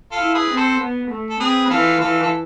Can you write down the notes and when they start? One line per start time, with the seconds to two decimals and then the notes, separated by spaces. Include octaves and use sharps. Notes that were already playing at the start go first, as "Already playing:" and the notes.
0.12 F4 A4
0.19 E4
0.34 G#4 B4
0.50 C4
0.57 A4 C5
0.80 B3
1.10 A3
1.30 A4
1.40 C4 G#4 B4
1.66 B4
1.70 E3 F4 A4
2.00 E3 F4 A4
2.23 A4